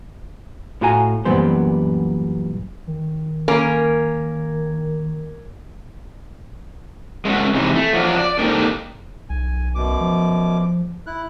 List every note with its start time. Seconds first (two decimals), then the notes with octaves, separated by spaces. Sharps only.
0.81 A2 E4 F#4 F5 G#5 A#5
1.25 F#2 A#2 E3 G3 B3 C5
2.87 D#3
3.48 A#3 C#4 A#4
7.25 G#3 A3 C4 C#4 F#4
7.55 C3 E3 G#3 D#4
7.75 A3
7.93 F3 F#3 D4
8.18 D5
8.39 A#3 D4 D#4 G4 A4 C5
9.29 B1 G#5
9.75 F#2 B2 D6
10.00 F3
11.07 E4 F#6